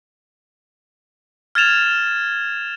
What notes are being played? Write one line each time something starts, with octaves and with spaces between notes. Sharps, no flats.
F6 G#6 A6 E7 F7